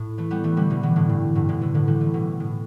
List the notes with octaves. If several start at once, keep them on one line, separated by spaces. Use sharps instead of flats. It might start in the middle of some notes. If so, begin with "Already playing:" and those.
Already playing: A2
E3 A3
G3 B3
E3 A3
D3 G3
B2 E3
B2 E3
A2 D3
G2
G2 B2
A2 D3
B2 E3
A2 D3
D3 G3
E3 A3
B2 E3
A2